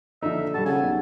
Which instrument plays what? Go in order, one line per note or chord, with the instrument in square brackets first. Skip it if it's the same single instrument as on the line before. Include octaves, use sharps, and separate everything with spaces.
[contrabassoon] D3 [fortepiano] F3 D#4 [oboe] E5
[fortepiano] G3 A4 [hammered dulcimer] F#4 [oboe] A5
[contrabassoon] C#3 [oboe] G#5
[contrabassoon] B1